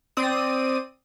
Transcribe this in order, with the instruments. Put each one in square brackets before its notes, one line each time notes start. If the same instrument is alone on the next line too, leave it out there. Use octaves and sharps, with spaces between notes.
[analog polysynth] C4 D5 D#6 D#7